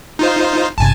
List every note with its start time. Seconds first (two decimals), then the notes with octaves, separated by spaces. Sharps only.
0.19 D#4 F4 C5
0.78 G#1 G2 C3 G#5 A5